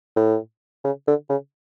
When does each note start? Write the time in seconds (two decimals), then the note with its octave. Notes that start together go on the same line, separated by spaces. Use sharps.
0.16 A2
0.84 C#3
1.08 D3
1.29 C#3